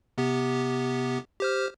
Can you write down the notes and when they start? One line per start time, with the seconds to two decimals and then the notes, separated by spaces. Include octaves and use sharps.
0.18 C3 B3 G4
1.40 G4 C5 F6